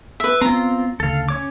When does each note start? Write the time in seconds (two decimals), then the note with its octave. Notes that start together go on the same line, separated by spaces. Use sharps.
0.20 B4 E5
0.41 B3 C4 F4 A#5
1.00 D2 C#3 A4 F5
1.29 C#4 C#5 D6